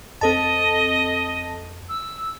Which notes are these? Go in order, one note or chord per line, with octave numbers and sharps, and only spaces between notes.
F2 C4 A4 D#5 A5
E6